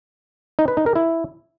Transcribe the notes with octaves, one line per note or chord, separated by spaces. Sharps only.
D#4
B4
D#4
A#4
E4